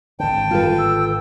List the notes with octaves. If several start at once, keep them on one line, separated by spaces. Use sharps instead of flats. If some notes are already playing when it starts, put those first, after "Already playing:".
G#1 D3 G5 A5
F4 A4 B4
E6